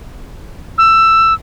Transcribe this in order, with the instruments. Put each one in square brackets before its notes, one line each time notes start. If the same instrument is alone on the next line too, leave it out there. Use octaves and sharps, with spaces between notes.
[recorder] E6